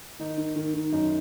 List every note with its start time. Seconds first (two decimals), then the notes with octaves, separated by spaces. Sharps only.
0.19 D#3 D#4
0.38 D#3
0.56 D#3
0.74 D#3
0.92 F#2 D#4